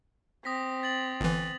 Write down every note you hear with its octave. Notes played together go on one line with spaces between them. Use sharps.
C4 D#6 A#6 B6
A6 F#7
G1 E3